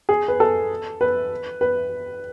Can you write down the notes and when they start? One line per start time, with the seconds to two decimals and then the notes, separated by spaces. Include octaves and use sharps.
0.09 G#4
0.28 B4
0.40 A4
1.01 B4
1.61 B4